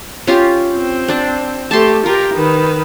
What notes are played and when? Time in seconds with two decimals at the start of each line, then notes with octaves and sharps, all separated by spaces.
0.27 C#4 F4 G4
0.74 C4
1.08 D4 D5
1.71 A3 G4 A5 C6
2.06 F4 G4 A#4
2.34 D#3 B4